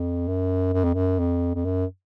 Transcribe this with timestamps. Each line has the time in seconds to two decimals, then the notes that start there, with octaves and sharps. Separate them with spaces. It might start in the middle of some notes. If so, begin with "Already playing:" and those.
Already playing: F2
0.28 F#2
0.73 F#2
0.84 F2
0.94 F#2
1.19 F2
1.55 F2
1.65 F#2